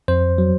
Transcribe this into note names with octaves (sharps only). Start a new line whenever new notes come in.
F2 C5
F#3